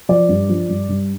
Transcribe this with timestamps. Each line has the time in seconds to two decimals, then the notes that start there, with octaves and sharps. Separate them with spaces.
0.09 F3 D5
0.29 G2
0.49 F3
0.69 G2
0.89 G2